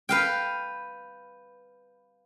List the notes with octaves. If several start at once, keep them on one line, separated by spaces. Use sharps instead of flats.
B4 F5 G5